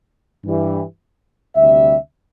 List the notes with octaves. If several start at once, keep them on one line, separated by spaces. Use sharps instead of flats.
G2 E3 G3
D2 C3 G3 E5